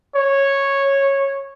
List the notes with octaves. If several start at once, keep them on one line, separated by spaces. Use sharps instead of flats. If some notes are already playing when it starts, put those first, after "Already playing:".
C#5